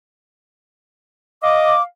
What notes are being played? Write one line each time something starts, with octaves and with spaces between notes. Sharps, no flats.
D#5 F5 D6